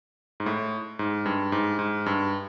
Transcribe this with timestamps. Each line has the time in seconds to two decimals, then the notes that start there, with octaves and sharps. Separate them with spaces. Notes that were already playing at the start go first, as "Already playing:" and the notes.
0.40 G#2
0.46 A2
0.99 G#2
1.26 G2
1.52 G#2
1.79 G#2
2.06 G2